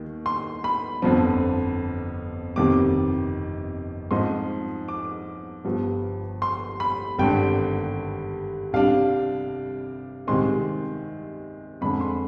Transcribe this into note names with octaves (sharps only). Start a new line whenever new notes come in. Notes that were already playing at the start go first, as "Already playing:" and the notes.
Already playing: D#2 D#3
C6
B5
G1 F2 D3 F3 C4
G1 F2 C3 D#3 G3 D6
G#2 F3 C4 D#4 C6
D6
G1 G2 F3
C6
B5
G#1 G2 D3 G5
C2 C3 G3 D4 F5
C2 C3 D#3 G#3 C4 C6
F2 D3 G#3 B5
C6